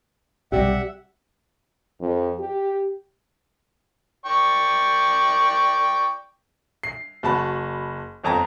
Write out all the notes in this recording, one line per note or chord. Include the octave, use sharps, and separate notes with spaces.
B1 C3 G3 G4 D5 E5 F#5
F2
G4
D5 G5 C#6
C7
F#1 F#4 A5 B5
G1 F2 A5 A#5